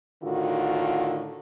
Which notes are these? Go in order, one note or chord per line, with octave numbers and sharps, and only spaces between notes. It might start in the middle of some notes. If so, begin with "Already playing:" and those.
A2 D3 D#3 F4 F#4